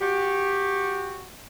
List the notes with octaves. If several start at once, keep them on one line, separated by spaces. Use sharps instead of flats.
F#4 G4